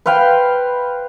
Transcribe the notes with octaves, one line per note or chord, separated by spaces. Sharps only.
B4 C5 F5 G5